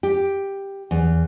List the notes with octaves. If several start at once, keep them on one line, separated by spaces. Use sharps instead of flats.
G4
E2